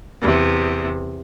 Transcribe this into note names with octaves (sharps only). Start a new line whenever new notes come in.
E2 C3